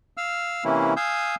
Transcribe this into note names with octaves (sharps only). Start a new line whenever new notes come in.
F5 E6 F6
C3 E3 A#3 C#4 E4
F5 G#5 D#6 E6 G6